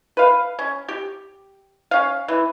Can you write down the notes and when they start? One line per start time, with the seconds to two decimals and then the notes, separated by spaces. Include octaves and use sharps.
0.17 B4 F5
0.59 C#4
0.89 G4
1.91 C#4 F5
2.28 E3